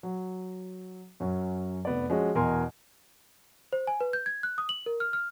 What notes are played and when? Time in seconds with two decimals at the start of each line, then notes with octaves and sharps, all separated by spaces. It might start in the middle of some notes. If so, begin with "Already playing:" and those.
0.03 F#3
1.20 F#2 F#3 C#4
1.85 F1 B3 D5
2.09 F3 G#3 C#4 F#4
2.35 E2 B2 A#4 D#5 G#5 C6
3.73 C5
3.87 G#5
4.01 B4
4.13 G6
4.26 G#6
4.43 F#6
4.58 D#6
4.69 F#7
4.86 A#4
5.00 F6
5.13 F6